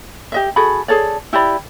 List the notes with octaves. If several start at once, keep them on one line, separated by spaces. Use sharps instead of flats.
G4 D#5 E5
F#4 G#4 A4 B5
G#4 A4 C#5 D5
E4 G4 D5 B5